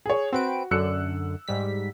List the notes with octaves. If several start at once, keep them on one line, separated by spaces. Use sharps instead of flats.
G#4 C#5
C4 F#4 B4 D7
F#2 D3 E6 F#6 C#7
G#2 G3 B6